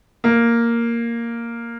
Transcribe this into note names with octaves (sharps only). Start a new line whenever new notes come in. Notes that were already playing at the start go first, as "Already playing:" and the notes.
A#3